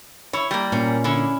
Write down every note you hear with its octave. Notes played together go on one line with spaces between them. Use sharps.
E4 C#5
G3 A#3
A#2 C#4
D3 C#4 E4